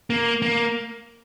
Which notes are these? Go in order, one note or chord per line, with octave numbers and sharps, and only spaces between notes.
A#3
A#3